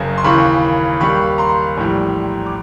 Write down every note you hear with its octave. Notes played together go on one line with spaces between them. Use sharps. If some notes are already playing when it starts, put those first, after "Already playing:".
Already playing: F#1 F#2 C#3
C6
D#2 C#3 E3 B5 C#6
D#2 D#3 G3 B5 C#6
A#5 C6
A#1 A2 E3 G3
D6